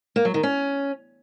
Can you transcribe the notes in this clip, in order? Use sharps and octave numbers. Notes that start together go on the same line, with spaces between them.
A#3
F#3
D#3
C#4